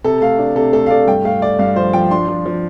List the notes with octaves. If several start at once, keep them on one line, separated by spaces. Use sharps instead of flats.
C3 A4
A3 F5
D4
C3 A4
A3 A4
F5
A3 D5
G2 G5
A3 F5
A3 D5
G2 F5
F3 C5
F3 G5
D4 C6
F3
F3